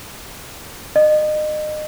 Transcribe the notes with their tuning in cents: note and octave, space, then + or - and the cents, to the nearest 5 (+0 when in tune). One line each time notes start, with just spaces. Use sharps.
D#5 -30